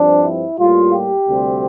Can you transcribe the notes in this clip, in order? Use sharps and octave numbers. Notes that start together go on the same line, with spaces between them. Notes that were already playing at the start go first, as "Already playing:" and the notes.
Already playing: G2 F3 C4 D4
E4
A2 G3 A#3 F4
G4
D2 C3 G3 C4